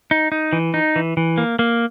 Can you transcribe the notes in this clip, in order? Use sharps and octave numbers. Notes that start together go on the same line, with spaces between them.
D#4
D#4
E3
D#4
E3
E3
A#3
A#3